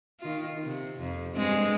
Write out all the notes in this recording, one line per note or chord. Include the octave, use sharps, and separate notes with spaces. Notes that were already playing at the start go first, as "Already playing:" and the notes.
D#3 F4
C3
F2
G2 G#3 C4